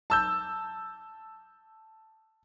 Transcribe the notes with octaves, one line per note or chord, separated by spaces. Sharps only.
A5 E6 G6